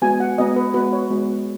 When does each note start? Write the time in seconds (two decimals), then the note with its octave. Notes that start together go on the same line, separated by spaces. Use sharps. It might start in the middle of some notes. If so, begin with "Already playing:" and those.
0.02 G#3 B3 F#4 G#5
0.20 F#5
0.38 G#3 B3 F#4 D#5
0.56 B4
0.74 G#3 B3 F#4 B4
0.93 C#5
1.10 G#3 B3 F#4